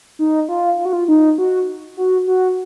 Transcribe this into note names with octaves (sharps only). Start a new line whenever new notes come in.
D#4
F4
F4
F#4
F4
D#4
F#4
F#4
F#4